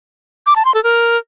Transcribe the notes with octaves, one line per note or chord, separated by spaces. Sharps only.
D6
A5
C6
A4
A#4